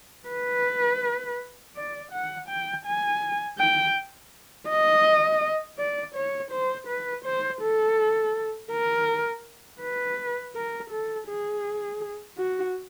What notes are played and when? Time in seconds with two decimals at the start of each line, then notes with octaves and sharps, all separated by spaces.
0.29 B4
1.76 D5
2.12 F#5
2.48 G5
2.85 G#5
3.59 G5
4.69 D#5
5.78 D5
6.15 C#5
6.51 C5
6.88 B4
7.25 C5
7.62 A4
8.71 A#4
9.81 B4
10.55 A#4
10.91 A4
11.28 G#4
12.38 F#4